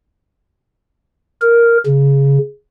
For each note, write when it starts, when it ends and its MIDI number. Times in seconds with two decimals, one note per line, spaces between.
1.41 1.78 70
1.87 2.39 49